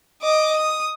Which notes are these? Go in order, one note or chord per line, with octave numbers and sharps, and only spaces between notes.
D#5 D6
D#6